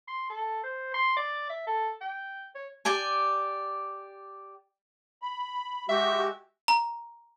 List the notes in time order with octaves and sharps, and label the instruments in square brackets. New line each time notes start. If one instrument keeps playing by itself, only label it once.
[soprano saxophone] C6
A4
C5
C6
D5
E5
A4
G5
C#5
[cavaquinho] G4 D5 G#5
[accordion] B5
[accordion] G#3 F#4 G4 [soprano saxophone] E5
[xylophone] A#5